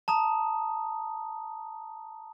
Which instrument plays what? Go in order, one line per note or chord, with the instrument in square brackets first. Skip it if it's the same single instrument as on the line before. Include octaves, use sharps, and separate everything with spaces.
[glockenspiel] A5 A#5 D#6